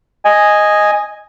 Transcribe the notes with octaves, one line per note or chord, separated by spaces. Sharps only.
D#5 G#5